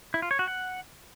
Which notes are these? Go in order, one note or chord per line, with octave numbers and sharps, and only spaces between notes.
E4
F4
C#5
F#4
F#5